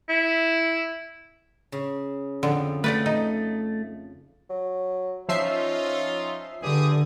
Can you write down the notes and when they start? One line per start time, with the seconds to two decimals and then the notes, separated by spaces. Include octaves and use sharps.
0.09 E4
1.72 C#3
2.43 F2 D3
2.84 A3 B4 D5 F#5
3.06 D#4
4.50 F#3
5.29 F3 C#4 D#4 F4 E5 C7
6.63 G2 D3 G4 G#4 D#6